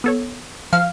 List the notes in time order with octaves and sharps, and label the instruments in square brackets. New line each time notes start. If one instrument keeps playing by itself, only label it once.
[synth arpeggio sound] B3 A4 C#5
[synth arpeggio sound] F3 [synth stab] F5